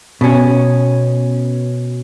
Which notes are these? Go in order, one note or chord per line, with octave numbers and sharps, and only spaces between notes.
B2 C#4